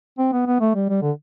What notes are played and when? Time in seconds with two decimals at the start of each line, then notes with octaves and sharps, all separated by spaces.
0.19 C4
0.33 B3
0.47 B3
0.61 A3
0.75 G3
0.89 G3
1.02 D3